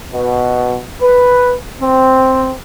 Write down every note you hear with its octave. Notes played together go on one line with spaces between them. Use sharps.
B2
B4
C4